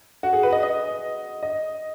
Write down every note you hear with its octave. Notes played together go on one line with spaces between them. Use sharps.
F#4
G#4
B4
D#5
D#5
D#5